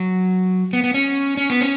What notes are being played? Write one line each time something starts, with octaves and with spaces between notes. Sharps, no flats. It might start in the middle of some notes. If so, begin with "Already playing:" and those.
Already playing: F#3
B3
B3
C#4
C#4
B3
C#4